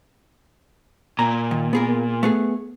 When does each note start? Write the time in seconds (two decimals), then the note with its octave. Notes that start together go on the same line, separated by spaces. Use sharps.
1.19 A#2 A#5
1.51 D#3
1.73 B3 G#4 A#4
2.23 A3 B3 G#4